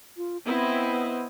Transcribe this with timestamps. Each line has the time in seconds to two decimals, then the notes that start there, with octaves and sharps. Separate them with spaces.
0.17 F4
0.45 B3 C4 E4 D#5